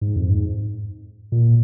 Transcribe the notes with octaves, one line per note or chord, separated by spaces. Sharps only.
G#2
F2
G#2
A#2